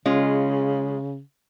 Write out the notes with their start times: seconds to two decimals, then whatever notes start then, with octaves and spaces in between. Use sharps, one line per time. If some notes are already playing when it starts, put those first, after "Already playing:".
0.06 C#3 G#3 C#4 F4